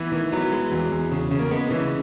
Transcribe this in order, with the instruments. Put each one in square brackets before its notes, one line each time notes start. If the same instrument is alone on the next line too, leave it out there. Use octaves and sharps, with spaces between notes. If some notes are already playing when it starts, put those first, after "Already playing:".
Already playing: [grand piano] E3 [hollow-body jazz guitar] B3
[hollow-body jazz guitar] D#3 [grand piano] E3
[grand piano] F#3 [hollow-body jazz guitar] B3
[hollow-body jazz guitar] G#3
[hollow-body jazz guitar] E2 [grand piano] F#3
[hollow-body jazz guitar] E2
C#3
C#3
[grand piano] A#3
[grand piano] G#3 [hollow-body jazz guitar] B3
[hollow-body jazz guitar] C#3 [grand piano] E3